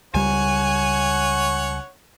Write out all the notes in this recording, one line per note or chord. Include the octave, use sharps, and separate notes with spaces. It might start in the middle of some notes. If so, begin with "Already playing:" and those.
C#2 G3 C#5 F#5 G#5